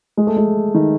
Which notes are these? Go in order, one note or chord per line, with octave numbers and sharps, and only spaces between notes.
G#3
A3
G#3
D#3